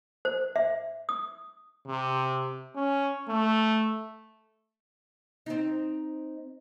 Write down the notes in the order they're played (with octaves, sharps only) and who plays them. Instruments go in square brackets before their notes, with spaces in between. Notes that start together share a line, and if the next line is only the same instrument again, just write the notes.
[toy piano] C5
E5
D#6
[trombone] C3
C#4
A3
[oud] C4 D#4